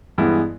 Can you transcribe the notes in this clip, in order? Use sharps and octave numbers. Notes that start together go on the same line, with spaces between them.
G2 E3 G#3 B3 E4